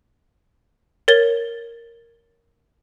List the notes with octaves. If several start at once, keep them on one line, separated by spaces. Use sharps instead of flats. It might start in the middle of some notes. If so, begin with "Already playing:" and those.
A#4 C#5 A6 G7